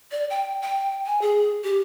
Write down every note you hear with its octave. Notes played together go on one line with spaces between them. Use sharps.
D5
G5
G5
G#5
G#4
G4